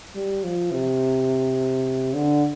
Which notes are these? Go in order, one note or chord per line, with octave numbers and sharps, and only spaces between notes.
G3
F3
C3
D3